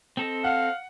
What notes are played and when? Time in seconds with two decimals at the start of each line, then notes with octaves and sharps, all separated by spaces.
0.17 C4 A4 D#5
0.44 F5 F#5